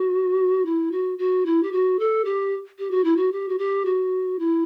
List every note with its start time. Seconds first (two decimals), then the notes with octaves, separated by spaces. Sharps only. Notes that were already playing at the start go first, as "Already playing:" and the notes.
Already playing: F#4
0.66 E4
0.92 F#4
1.18 F#4
1.46 E4
1.63 G4
1.72 F#4
1.99 A4
2.25 G4
2.79 G4
2.91 F#4
3.04 E4
3.17 F#4
3.32 G4
3.49 F#4
3.58 G4
3.85 F#4
4.39 E4